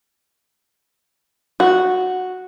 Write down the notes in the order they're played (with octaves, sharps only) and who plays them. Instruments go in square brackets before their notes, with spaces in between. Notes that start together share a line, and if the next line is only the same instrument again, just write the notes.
[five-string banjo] F#4